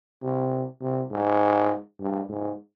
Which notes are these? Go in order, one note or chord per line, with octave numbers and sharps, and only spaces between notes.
C3
C3
G#2
G2
G#2